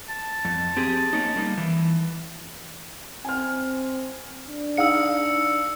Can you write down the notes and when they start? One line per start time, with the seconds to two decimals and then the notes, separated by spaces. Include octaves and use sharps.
0.09 A5
0.45 F2
0.77 C4 G4 G#4
1.13 A#3 C#4 D#4
1.36 G3 A#3 D#4
1.57 E3
3.25 C4 G#5 F6
4.48 D4
4.77 D#4 G#4 F5 E6 C#7